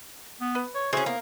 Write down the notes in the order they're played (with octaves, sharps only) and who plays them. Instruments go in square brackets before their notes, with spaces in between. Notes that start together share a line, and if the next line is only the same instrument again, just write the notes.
[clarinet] B3
[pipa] B4
[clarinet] C#5
[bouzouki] C#4 G#4 [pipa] E4 C5 C#6 [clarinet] F#4
[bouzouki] A#3 [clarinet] B3